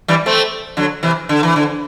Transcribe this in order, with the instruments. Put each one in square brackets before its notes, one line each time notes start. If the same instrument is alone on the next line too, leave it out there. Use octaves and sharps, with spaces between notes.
[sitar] E3 G3
A3 C4
D3 F#3
C3 E3
D3
E3
D3